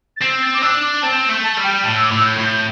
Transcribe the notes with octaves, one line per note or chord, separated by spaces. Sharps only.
A6
C4 C7
A6
D6
D4 E6
D6
C4 A5
A3
A5
G3
G5
A2 A5
E6
D6
A2 E6
G6
A2
G6